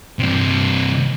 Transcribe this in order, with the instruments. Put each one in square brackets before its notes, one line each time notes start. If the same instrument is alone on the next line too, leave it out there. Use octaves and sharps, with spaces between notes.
[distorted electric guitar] G2 C3